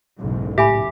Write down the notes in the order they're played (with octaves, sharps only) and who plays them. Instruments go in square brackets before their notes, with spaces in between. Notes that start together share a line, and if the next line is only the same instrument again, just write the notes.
[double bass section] F#1 B1 G#2
[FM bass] A2 [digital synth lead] G4 [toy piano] E5 G#5 B5